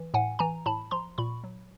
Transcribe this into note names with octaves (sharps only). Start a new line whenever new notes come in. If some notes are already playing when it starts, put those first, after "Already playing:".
Already playing: E3
A2 F#5 G#5
E3 G#5 A#5
A2 A5 B5
F3 A#5 C6
A#2 B5 C#6
F#3